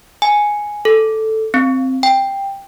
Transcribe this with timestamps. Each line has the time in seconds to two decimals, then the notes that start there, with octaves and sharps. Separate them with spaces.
0.22 G#5
0.85 A4
1.54 C4
2.03 G5